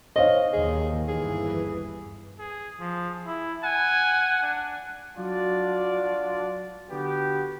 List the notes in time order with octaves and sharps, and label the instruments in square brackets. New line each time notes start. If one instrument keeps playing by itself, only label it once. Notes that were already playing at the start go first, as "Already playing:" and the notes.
[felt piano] C5 C#5 F5 [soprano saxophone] D#5
[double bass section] D#2 D#3 [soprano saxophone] G#4
[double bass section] G1 E3 [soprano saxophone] G#4
[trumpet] G#4
[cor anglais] F3 [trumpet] G#4
[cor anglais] E4
[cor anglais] F#5 [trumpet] G#5
[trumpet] D4
[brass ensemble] F#3 D4 F4 F#4 D5
D3 B3 F#4 G4